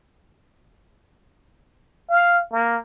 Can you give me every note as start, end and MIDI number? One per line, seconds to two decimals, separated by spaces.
2.10 2.41 77
2.52 2.77 58